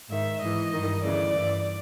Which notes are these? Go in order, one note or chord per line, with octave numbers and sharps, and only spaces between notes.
G#2 D#3 E5
G#2 E3 D#5
G2 D#3
D2 C#3 E3 D5
G2 E3